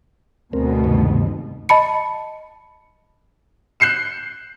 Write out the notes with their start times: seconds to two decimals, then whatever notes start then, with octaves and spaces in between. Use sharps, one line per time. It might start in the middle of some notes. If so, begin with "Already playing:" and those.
0.53 D2 B2 C4 A#4
0.84 G2 C3 D#3
1.69 D#5 A5 B5 C#7
3.80 F#6 G6 C7 C#7 E7